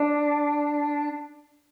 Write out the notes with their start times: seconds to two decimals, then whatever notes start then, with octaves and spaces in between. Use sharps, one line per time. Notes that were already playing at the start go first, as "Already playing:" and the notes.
Already playing: D4